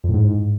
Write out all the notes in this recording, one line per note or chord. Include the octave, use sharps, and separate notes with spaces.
F2
A2
G#2